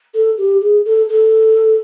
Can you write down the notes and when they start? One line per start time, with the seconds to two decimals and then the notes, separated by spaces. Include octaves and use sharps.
0.14 A4
0.38 G4
0.61 G#4
0.85 A4
1.09 A4